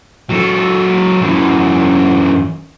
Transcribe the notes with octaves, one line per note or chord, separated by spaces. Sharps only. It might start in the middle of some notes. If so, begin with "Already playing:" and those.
F#3 A4
F#2 E3